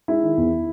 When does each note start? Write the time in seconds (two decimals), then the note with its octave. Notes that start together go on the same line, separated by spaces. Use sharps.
0.08 G#3 E4
0.23 D#3
0.37 E2